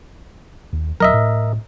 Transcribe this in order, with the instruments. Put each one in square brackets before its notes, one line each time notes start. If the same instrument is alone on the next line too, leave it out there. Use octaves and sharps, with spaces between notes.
[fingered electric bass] D#2
[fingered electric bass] D#1 C2 F#3 [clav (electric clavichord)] A#4 D#5 E5
[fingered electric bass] A2